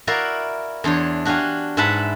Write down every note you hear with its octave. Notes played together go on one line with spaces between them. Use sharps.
E4 F#4 A#4 D5 F5
E2 D4 C5 C#5
D4 F#4 G4 F5 G#5
G#2 E4 B4 F#5 A5 B5